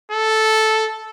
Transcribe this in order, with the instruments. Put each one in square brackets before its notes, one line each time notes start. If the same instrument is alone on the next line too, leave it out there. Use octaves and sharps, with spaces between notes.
[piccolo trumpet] A4